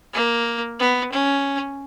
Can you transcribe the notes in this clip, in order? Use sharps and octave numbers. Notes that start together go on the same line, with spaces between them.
A#3
B3
C#4